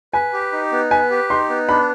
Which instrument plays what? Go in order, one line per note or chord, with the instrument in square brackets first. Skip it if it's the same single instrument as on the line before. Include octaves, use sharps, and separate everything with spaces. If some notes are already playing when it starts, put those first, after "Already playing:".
[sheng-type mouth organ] B4 [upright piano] G#5
[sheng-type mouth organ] G4
D#4
B3
[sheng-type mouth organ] B4 [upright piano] G#5
[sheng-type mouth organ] G4
[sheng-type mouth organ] D#4 [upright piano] C6
[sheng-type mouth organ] B3
[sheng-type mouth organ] D4 [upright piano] B5